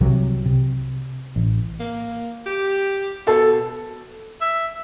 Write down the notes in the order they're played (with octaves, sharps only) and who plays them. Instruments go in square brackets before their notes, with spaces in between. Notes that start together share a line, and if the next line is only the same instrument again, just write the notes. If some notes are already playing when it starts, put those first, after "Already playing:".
[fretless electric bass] C2 C3 F#3
C3
A1
[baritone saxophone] A#3
G4
[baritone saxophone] B2 [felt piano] A4
[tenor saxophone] E5